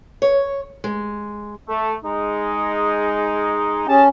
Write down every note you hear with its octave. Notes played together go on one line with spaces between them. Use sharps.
C#5
G#3
A3
G#3 D#4
C#4 G4 G#4 A5